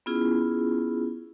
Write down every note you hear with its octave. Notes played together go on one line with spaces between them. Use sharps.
B3 C#4 E4 F4 G#4